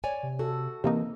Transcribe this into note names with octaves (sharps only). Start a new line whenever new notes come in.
C#5 D5 G#5
C3
F#4 A4
C3 E3 A#3 D#4